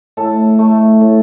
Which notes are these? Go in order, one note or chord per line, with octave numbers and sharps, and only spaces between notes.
A2 A4
A3
A2